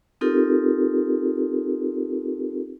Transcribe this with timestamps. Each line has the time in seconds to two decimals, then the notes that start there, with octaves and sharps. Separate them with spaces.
0.21 C4 D#4 F4 G4 A4 A#4